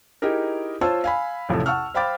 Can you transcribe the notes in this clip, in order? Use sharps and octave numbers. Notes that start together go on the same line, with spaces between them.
D#4 E4 G4 G#4 A#4
F4 C5 C#5 A5 E6
F5 G#5 B5
A1 F2 C3 A4
F#5 A5 C#6 E6 F6
C5 F5 G5 B5 D6 A6